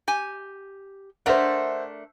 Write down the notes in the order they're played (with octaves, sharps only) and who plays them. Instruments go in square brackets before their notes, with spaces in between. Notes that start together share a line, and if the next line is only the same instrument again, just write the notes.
[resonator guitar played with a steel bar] G4 G#5
[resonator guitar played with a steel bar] A3 D4 A#4 [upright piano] C5 E5 F#5